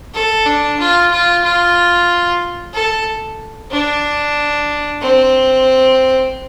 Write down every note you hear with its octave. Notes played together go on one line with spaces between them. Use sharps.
A4
D4
F4
F4
F4
A4
D4
C4